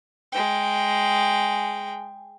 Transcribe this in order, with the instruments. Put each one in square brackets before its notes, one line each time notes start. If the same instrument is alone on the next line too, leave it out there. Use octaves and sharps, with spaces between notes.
[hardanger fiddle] G#3 G5